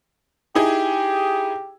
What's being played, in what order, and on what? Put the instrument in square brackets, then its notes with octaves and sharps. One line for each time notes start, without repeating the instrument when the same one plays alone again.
[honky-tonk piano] D#4 E4 G#4 [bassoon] G4